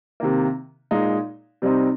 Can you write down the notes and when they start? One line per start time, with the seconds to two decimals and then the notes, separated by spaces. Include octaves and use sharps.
0.20 C3 D#3 A#3
0.91 A#2 G#3 D#4
1.62 C3 G3 C4 D#4